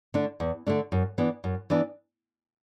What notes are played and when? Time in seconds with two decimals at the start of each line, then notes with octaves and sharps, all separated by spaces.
0.14 D3 A3 D4
0.40 E2
0.67 D3 A3 D4
0.92 F#2
1.18 E3 B3 D4
1.44 F#2
1.70 E3 B3 D4